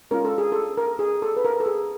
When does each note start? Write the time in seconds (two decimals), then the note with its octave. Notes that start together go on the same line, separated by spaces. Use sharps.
0.11 G#3 C#4 F4 A#4
0.25 A4
0.38 G#4
0.52 A4
0.77 A#4
0.99 G#4
1.22 A4
1.37 B4
1.45 A#4
1.60 A4
1.66 G#4